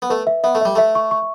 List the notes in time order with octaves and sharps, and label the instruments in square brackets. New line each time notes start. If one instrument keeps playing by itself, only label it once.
[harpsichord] B3
[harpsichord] A3 [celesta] B4
[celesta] E5
[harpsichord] B3 [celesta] E5
[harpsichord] A3
[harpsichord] G3 [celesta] E5
[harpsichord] A3 [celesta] E5
[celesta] C#6
C#6